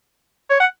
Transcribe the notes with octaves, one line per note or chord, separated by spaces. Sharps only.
C#5
F#5